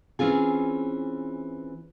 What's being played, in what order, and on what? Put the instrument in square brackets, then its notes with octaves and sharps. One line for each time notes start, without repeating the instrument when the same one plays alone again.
[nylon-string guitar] E3 C4 C#4 F4 G#4